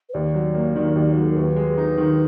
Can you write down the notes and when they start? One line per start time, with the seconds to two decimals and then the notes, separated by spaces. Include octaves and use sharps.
0.09 B4
0.14 D#2 D5
0.34 F#3
0.54 A#3
0.76 D#3
0.95 D#2
1.13 F#3 F#4
1.21 G#4
1.29 A#4
1.37 D#2 B4
1.56 G#3
1.78 D#4
1.97 D#3